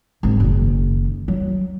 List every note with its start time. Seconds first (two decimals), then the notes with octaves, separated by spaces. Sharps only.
0.23 G#1 D#3
0.40 F#1 D#3
1.28 F#3